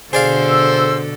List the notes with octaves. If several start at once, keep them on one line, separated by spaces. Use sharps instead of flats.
B2 D3 G#4 A4 C5 D5 F5
E6